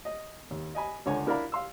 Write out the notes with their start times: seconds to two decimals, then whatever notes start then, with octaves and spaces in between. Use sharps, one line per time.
0.05 D#5
0.51 D#2
0.75 D#5 G#5 B5
1.06 C#2 D3 C#5 G#5
1.26 D4 E4 A#4 D5 F5 B5
1.52 F5 C6 E6